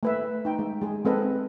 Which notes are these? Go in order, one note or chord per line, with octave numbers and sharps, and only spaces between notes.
A3 B4 E5
D#4 G5
G#3
G#3 G#4
G#3 C4 A4 B4 D#5